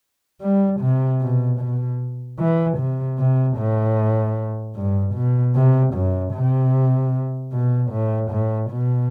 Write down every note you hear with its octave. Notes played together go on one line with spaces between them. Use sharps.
G3
C3
B2
B2
E3
C3
C3
A2
G2
B2
C3
F#2
C3
B2
A2
A2
B2